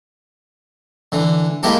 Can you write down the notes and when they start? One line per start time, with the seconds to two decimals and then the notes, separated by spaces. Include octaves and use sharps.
1.12 D3 E3
1.63 G#3 A#3 E4 G4 A4